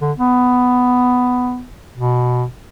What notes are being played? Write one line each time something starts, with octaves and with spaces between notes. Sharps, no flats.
D3
B3
B2